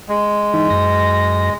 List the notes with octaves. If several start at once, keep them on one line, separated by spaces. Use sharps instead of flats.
G#3
E3 D#4
F#2 A#6